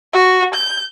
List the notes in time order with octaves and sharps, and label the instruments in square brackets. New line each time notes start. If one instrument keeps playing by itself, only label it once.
[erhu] F#4
G6